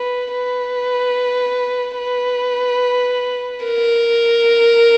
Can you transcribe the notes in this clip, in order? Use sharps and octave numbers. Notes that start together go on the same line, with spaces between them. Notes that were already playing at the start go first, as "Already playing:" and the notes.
Already playing: B4
B4
B4
A#4